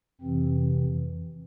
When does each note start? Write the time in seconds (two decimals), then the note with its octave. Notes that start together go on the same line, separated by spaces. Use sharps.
0.21 F2 C3 E3 C4